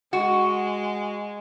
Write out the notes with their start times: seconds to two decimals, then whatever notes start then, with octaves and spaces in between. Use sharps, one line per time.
0.13 G#3 F#4